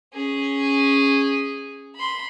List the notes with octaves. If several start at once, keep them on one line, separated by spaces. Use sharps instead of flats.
C#4 G#4
B5 C6